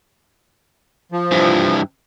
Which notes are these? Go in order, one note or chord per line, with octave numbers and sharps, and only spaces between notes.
F3
G2 E3